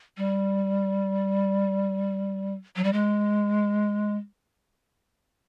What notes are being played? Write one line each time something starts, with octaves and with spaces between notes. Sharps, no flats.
G3
F#3
G3
G#3